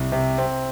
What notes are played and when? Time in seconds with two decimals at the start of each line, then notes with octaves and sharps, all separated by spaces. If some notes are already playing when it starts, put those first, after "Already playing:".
Already playing: C2
0.12 C3
0.38 C4